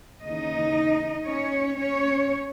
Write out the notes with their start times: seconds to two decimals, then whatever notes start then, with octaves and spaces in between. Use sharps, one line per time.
0.24 D#2 C#3 E3 D#4 D#5
1.27 C#4 C#5
1.79 C#4 C#5